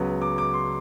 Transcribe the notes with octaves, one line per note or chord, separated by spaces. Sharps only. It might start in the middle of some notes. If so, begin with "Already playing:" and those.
Already playing: C#2 C#3 F#3 B3
D6
D6
C6